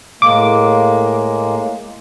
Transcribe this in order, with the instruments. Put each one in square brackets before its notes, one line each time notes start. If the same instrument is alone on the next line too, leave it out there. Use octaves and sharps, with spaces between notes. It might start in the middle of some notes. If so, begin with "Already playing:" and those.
[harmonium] A2 G#3 A#3 [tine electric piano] D6